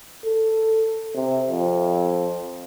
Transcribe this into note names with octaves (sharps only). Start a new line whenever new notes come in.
A4
C3
F2